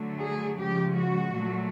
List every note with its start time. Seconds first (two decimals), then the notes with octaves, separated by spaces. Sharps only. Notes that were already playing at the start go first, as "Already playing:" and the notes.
Already playing: D3 F#3 A3
0.22 G#4
0.59 C#3 F3 G#3 G4
0.97 F#4
1.34 A#2 F#3 A3